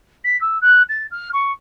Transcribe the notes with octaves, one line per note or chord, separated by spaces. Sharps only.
B6
E6
F#6
A6
F6
C#6